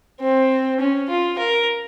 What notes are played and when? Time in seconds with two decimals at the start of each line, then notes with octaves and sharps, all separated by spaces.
0.21 C4
0.80 C#4
1.09 F4
1.39 A#4